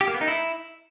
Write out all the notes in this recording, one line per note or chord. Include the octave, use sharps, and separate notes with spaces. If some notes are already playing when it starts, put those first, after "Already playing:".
G4
A#3
B3
D#4
E4